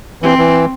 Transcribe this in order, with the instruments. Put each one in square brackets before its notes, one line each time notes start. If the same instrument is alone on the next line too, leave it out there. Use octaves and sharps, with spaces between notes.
[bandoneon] E3 [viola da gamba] C4
[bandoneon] E3